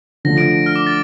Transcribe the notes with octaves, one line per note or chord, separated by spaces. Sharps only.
D3 F3 A3 A#6
D7
D7
F6
D6
A6